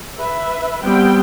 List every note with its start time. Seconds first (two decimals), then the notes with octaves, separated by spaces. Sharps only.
0.18 B4 E5
0.83 G3 B3 C4 G5